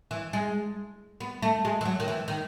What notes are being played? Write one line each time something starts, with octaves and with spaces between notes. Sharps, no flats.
E3
G#3
B3
A3
G#3
E3
F#3
D#3
E3
D#3